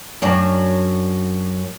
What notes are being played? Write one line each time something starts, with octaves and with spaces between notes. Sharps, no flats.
F#2 F#3 D4